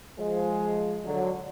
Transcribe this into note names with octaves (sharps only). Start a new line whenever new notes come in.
F3 G#3
D3 F#3